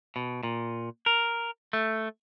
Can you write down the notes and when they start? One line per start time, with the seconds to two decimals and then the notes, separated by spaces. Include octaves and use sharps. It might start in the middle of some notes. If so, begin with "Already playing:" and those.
0.16 B2
0.43 A#2
1.06 A#4
1.73 A3